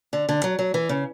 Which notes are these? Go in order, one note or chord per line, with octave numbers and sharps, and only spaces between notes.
D3
D3
F#3
F#3
E3
C#3